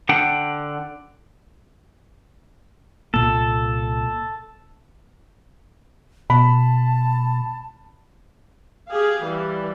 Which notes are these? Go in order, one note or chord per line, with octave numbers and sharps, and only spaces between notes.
D3 D4 F#5 G5
C2 A#2 A#3 A4
B2 A5 B5
G4 G#4 F5
E3 G3